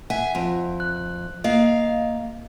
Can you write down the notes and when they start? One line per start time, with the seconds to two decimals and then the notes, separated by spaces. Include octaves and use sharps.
0.10 E5 F#5 G#5
0.35 F2
0.80 F#6
1.44 A#3 D#5 F5